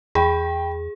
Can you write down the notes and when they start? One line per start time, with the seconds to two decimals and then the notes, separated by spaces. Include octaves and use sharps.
0.15 E2 G#4 G5 B5